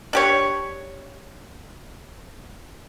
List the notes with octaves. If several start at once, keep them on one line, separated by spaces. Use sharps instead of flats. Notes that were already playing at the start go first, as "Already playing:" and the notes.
D4 G4 C#5